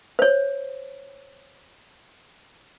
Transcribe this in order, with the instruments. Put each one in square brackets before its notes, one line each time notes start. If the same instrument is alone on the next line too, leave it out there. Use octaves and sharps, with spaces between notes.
[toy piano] C5 C#5